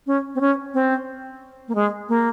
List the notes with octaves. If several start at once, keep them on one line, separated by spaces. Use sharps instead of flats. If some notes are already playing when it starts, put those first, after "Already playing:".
C#4
C4
C#4
C4
A#3
G#3
A#3